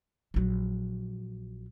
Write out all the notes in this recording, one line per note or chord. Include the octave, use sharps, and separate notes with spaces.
A#1 F#3